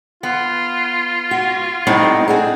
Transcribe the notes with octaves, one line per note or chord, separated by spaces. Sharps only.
B3 F4
F#4
A2 G3 B3 C4 D#4
C4 D4 G#4 F#5